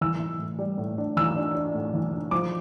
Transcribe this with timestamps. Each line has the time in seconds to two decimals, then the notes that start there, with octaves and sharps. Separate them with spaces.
0.01 E3 E6
0.20 E3
0.39 A2
0.59 G3
0.78 A2
0.98 D4
1.17 E3 E6
1.36 D4
1.55 D4
1.74 A2
1.94 E3
2.13 D4
2.31 F3 D6